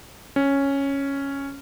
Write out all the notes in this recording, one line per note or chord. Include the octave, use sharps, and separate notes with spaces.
C#4